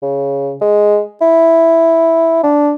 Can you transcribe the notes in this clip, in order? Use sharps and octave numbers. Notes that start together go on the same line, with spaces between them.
C#3
G#3
E4
D4